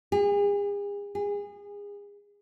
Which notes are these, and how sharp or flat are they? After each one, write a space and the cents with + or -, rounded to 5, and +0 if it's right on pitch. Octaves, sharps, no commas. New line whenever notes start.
G#4 -40
G#4 -30